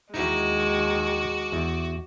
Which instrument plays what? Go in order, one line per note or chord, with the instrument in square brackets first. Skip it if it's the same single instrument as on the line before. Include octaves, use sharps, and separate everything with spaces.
[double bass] D#2 D#3 [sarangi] G#3 [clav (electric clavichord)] D#4 E4 [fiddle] F#4 D6
[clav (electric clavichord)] E2